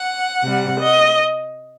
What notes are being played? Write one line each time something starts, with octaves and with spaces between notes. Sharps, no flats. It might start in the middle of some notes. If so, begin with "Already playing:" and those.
Already playing: F#5
C3 G3
D#5